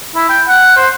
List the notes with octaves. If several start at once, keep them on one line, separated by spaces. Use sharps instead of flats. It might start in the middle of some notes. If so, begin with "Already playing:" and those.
E4
G5
F#5
C5